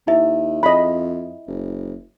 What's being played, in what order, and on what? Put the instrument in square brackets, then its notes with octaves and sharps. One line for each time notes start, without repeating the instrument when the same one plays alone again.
[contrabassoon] D#2 [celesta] E4 E5
[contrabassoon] F2 [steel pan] D#5 B5
[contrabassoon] F#1